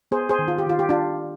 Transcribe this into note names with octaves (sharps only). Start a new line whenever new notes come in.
B3 G#4 C5
G#4 C5
D#3
F4
G4
D#3 F4
G4
D4 F4